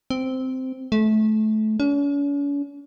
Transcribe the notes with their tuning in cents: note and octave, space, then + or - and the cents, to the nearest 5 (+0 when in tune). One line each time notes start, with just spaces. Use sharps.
C4 -10
A3 -25
C#4 +45